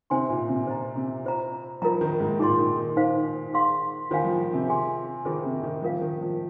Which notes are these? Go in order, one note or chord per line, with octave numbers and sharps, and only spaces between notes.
C3 D#4 C5 G#5 C6
A#2
C3
C3 C5 D#5 A#5
C3
F4 C5 D#5 A#5
F3 F4 A#4 D#5 A#5
D#3
G#2
A#2 D#4 G#4 D#5 C6
D#3
D#3
D#4 C5 F5
G#4 F5 C6
D#3 F4 C5 F5 G#5
F3
C3
G#4 D#5 G#5 C6
D#3 F4 G#4 C5 D#5
C3
D#3
F3 F4 A#4 F5
D#3
F3